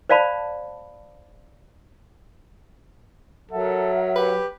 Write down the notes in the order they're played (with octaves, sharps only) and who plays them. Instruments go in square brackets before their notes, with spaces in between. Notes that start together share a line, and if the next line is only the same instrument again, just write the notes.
[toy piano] C5 D5 F5 A5 B5
[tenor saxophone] F#3 [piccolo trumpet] A4 [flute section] A#4 E5 F#5
[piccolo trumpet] G4 [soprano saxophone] B4